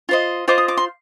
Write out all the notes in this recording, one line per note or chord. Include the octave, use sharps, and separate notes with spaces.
F4 C5 D#5
F4 C5 D#5 D6
D#6
D6
C6